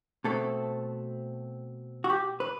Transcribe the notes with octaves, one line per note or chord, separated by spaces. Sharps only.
B2 A3 C4 A4
F#4
G4
B4